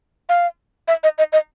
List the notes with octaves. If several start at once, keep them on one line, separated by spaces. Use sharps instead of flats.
F5
E5
D#5
D#5
D#5